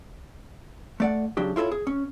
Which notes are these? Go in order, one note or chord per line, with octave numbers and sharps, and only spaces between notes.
A3 D5 F#5
C#3 F#3 D4 G4
E4 F4 A4 A#4 C#5
G#4
C#4